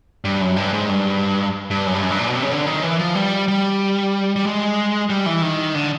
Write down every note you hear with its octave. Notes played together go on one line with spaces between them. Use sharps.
G2
F#2
G2
G#2
G2
G2
F#2
G2
F#2
G2
A#2
B2
C3
C#3
D3
D#3
E3
F3
G3
G3
G3
G#3
G3
E3
D#3
D3